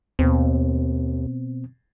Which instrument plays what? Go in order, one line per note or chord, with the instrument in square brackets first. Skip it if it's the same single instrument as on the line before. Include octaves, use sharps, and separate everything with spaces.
[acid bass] D#2 [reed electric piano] B2 B3 C4